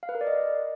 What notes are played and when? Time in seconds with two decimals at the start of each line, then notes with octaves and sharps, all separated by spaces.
0.03 F5
0.09 B4
0.15 A#4
0.21 D5
0.27 D#5